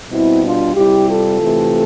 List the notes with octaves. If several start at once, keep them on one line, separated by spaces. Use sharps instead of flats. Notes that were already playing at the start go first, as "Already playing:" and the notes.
B2 G3 C4 E4
D4 F4
C3 G3 E4 G4
F4 A4
C3 E3 A3